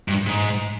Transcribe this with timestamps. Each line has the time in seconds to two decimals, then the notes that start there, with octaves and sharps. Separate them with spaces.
0.08 G2
0.27 G#2